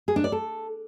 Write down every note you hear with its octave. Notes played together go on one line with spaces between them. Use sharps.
G#4
D4
D5
A4